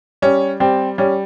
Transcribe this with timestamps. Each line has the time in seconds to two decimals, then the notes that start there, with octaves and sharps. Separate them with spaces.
0.22 G3 C#4
0.60 G3 C4
0.98 G3 C#4